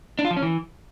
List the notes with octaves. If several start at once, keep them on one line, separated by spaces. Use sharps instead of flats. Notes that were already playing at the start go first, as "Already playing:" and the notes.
D4
F4
F3
C#4
E3